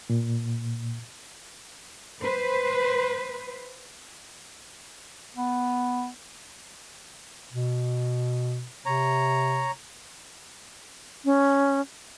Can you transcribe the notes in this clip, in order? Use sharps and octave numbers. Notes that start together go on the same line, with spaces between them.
A#2
B4 C5
B3
B2
C3 C#5 A#5
C#4